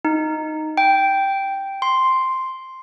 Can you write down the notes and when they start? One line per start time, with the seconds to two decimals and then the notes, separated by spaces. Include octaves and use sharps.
0.05 D#4
0.77 G5
1.82 C6